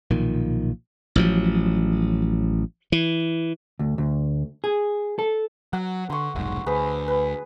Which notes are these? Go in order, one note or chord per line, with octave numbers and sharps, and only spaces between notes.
B1 A#2 D#3 F3
A1 F3 F#3
E3
D2
D2
G#4
A4
F#3 F#5
D3 C6 C#6
F1 B1 G#2
D2 G#4 B4 C5
B4